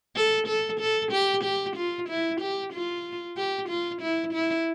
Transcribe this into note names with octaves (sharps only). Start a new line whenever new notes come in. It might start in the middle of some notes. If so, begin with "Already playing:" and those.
A4
A4
A4
G4
G4
F4
E4
G4
F4
G4
F4
E4
E4